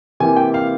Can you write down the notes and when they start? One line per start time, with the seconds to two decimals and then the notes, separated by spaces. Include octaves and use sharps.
0.20 C3 E3 A#3 G#5
0.36 G5
0.54 F5